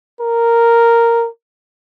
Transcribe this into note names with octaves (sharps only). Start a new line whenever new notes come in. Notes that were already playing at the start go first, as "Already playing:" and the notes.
A#4